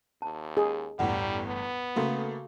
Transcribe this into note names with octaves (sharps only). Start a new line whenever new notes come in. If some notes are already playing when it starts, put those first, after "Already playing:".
D#2 A5
G#4
G1 E2 A2 G3 F#5
B3
C#3 A3 A#3 F#4 A4 F5